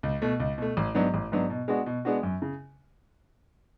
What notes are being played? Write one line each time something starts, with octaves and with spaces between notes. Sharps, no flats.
C#2
B2 A3
C#2
B2 A3
A1
G#2 F#3 B3 D4
A1
G#2 F#3 B3 D4
B2
G#3 B3 D4 F#4
B2
G#3 B3 D4 F#4
F#2
C#3